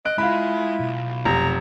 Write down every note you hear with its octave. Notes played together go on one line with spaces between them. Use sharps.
D#5 F#6 D7
G#3 E4 F4 B5
B1
F1 A#5